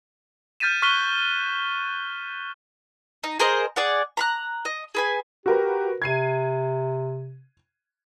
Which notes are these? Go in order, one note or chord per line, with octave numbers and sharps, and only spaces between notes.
F6 G6 A6 B6 D#7 E7
C#6 F6 F#6 B6 D#7 G7
D#4
G#4 A#4 C5 D#5
G#4 D5 F#5
A#5 B5 F#6
D#5
G#4 B4 G#5
F#4 G4 A#4 B4
C3 G#6 C7 D#7